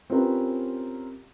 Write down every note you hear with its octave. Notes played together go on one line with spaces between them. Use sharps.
C4 C#4 F4 G4 A#4 B4